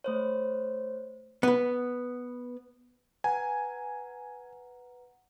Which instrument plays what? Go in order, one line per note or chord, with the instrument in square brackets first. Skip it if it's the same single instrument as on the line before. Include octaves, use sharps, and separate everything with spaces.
[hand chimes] A3 C5 C#5
[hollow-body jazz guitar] B3 B4
[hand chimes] B4 F#5 A#5 [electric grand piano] G#5